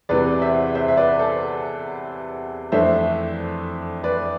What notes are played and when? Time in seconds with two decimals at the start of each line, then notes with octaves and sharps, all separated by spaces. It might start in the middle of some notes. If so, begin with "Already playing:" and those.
0.09 E2 C3 E3 B4 D5
0.42 C5 E5
0.75 C5 E5
0.88 E5
0.97 B4 D5
1.19 A4 C5
2.72 F2 E3 A3 D4 C5 E5
4.04 B4 D5